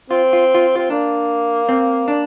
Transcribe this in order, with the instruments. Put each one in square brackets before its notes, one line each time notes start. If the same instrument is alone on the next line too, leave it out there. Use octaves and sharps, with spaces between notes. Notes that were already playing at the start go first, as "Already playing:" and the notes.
[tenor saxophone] C4 [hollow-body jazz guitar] F4
[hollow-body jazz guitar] F4
F4
[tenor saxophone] C4 [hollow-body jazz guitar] F4
[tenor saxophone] A#3 [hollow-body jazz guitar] D4
[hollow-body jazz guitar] C4
D4